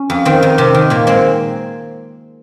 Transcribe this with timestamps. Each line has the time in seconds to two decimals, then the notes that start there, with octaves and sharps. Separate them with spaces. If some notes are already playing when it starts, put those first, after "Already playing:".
Already playing: C#4
0.10 F2
0.25 D#3 C4
0.43 D#3
0.58 C3
0.74 D#3
0.90 A#2 A#3
1.07 G#3 C4